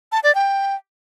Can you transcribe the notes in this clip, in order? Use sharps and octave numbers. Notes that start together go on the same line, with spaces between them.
A5
D5
G5